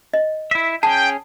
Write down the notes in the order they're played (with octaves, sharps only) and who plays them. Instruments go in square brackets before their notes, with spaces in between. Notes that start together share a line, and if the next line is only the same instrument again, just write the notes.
[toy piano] D#5
[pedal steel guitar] E4 E5
[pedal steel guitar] C#4 G#4 [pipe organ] G5 [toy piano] A5